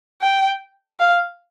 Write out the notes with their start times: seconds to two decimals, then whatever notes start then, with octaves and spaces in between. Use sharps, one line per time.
0.21 G5
1.00 F5